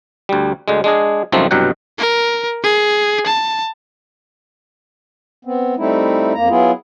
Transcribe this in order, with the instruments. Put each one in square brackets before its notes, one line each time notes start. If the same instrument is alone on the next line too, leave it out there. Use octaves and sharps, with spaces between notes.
[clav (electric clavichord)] D2 G3
D2 D3 G#3
G#3 D4 G#4
C2 F#2 D#3 F3 A3 C4
C2 G2 B2 F#3 F#5 G5
[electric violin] A#4
G#4
A5
[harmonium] B3 C4
G3 A3 C4 D#4 E4
F2 A#3 A#5
F#3 B3 E4 F4 G#4